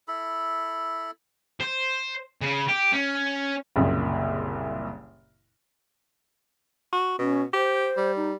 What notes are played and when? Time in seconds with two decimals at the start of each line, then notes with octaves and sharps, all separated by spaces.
0.08 E4 A4 B5
1.60 C5
2.42 C#3
2.68 G4
2.92 C#4
3.76 F#1 C2 A#2 C#3
6.93 F#4
7.19 B2 C#4
7.54 G4 C5
7.97 G3
8.16 D#4